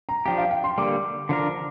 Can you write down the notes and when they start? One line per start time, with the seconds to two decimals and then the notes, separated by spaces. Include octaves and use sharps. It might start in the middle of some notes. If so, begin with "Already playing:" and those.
0.09 A#5
0.26 F3 D4 G4 G5
0.38 F5
0.51 G5
0.64 C6
0.78 D3 G3 A#3 D6
1.29 D3 F3 D4 A#4